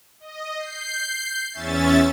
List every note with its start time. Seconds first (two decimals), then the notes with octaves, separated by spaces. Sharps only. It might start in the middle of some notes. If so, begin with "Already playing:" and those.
0.20 D#5
0.57 G6 C7
1.53 E2 C#4 E5 A6